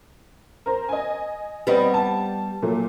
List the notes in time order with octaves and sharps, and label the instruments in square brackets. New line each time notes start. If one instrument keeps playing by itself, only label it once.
[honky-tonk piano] A#4 C5
D#5 G#5
[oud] G3 B3 [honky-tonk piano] C4 D#5
[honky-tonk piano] A5
A#2 F#3 A3